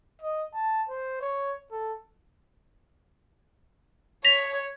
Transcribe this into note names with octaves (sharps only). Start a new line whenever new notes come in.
D#5
A5
C5
C#5
A4
C#5 A#6 B6 F7